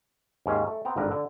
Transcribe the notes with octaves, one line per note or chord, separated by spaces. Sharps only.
D#2 G#2 C#4 F5
A3
B3 C4 G5 A#5
G#1 G2 D3 A#4 B4
D3